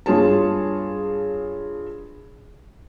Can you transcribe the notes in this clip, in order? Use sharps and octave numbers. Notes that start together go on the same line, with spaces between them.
G2 F4 G#4 C#5 A5